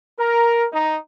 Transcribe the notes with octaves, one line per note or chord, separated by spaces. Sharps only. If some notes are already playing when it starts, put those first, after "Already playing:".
A#4
D#4